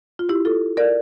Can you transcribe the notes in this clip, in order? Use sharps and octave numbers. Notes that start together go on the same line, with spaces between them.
F4
E4 G4
F4 A4
A#4 D5